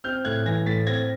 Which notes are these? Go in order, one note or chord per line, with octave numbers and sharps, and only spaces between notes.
C4 F6 G6
A2 F#6 G#6
E3 G#6 A#6
A2 A6 B6
C4 G#6 A#6